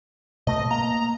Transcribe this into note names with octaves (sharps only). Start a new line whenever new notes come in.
B2 A3 D#5
A#3 A#5